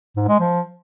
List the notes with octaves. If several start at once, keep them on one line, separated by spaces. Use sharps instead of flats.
G#2
G#3
F3